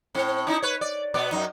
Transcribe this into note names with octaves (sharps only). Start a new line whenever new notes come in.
A2 C4
C#4 D#4 E4
B4 C#5
D5
B2 B3 D5
F#2 D#4